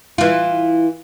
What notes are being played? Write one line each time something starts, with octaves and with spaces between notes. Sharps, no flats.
E3 F4